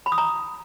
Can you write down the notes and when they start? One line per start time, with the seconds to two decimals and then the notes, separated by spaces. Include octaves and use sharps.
0.06 B5
0.12 D#6
0.18 A#5